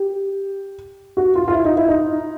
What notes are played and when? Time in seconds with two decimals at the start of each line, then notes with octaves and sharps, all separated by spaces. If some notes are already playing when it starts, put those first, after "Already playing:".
Already playing: G4
1.17 F#4
1.36 F4
1.48 F4
1.52 E4
1.65 D#4
1.77 E4
1.88 D#4